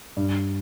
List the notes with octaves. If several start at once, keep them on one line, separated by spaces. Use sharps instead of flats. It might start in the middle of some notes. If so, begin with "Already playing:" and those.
G2